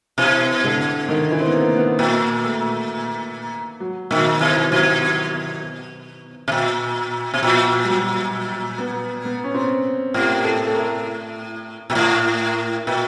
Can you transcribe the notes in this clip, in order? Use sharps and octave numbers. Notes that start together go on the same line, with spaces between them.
B2 E3
D3
D#3
E3
C4
B3
A#3
B3
A#2 A#3
A3
F#3
A#2 D#3
B2 E3
B2 F#3
B2
A#2
B2
A#2 F3
G3
F#3
B3
B3
C#4
C4
A2 G4
A4
A4
A#4
A#2
A2
A#2 B4